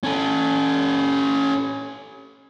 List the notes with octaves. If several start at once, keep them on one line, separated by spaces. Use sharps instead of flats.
C#4 A4